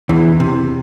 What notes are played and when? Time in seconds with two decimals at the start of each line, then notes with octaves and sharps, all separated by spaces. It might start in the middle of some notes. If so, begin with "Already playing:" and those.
0.09 E2 E3
0.40 C3